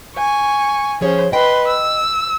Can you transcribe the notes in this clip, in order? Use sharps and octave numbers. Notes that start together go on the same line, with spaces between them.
G#5 C#6
F3 C#4 G#4 C5 C#5
B4 D#5 G5 C6
E6